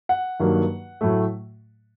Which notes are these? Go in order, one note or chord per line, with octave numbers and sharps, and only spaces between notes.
F#5
G2 D#3 F#3 A#3
A2 F#3 A3